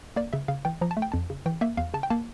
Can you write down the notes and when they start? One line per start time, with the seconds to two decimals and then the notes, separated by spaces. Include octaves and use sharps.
0.16 A#3 D5
0.33 C#3 E5
0.48 C#3 F5
0.65 E3 G5
0.81 F3 A#5
0.91 A5
0.97 A3
1.02 G5
1.12 F2 A5
1.30 C#3
1.46 E3 G5
1.61 A#3 E5
1.77 E2 F5
1.94 C#3 A5
2.03 G5
2.10 A#3 A5